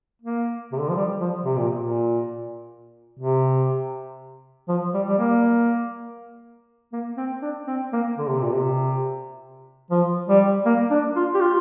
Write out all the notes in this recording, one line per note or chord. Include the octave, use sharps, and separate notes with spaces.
A#3
C3
D3
F3
G3
F3
C3
A#2
A#2
C3
F3
G3
G3
A#3
A#3
C4
D4
C4
A#3
D3
C3
A#2
C3
F3
G3
A#3
D4
F4
G4
F4